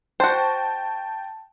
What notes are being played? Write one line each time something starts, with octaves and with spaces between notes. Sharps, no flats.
F#4 C5 G5 A5